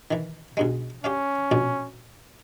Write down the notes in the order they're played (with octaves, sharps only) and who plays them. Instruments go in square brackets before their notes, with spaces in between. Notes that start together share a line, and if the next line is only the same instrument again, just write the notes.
[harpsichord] D#3 E3
B1 G2 G#3
[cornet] C#4 [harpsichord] G4 D5 F5
[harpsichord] A#1 B2 D5